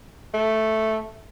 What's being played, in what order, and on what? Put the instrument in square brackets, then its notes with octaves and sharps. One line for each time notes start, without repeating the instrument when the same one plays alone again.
[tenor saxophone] A3